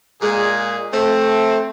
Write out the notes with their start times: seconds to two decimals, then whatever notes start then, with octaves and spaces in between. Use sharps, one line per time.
0.22 A#2 G#3 G#4
0.93 A3 C4